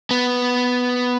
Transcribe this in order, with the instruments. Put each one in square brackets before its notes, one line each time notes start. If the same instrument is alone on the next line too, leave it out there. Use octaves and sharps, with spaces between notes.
[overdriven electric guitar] B3